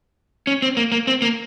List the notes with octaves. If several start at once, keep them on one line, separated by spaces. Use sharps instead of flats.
C#4
C4
A#3
A#3
C4
A#3